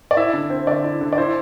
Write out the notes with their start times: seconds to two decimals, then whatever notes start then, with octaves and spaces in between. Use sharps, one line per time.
0.11 D5
0.17 E4 E5
0.33 D3
0.50 C4
0.67 D3 D5
0.84 E4
1.01 D3
1.13 D5
1.18 E4 C5